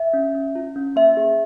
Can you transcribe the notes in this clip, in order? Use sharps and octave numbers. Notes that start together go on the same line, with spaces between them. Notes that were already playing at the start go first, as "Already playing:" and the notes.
Already playing: E5
C#4
C#4
F4
C#4
A#3 E5
G#4